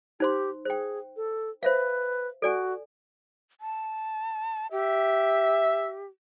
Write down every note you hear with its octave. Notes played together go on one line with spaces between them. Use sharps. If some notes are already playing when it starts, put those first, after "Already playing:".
D#4 G4 C5 C6
G#4 C5 G5
A4
B4 C5 E5 F5
F#4 A4 D5 G#5
A5
G4 E5